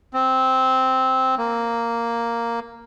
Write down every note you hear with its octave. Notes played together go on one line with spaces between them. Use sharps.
C4
A#3